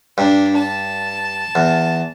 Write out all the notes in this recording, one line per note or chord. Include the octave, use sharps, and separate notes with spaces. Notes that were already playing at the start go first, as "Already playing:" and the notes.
G2 D4
A5
E2